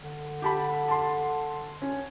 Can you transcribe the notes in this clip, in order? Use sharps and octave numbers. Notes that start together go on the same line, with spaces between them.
D3
G4 A5 B5
A5 C6
C#4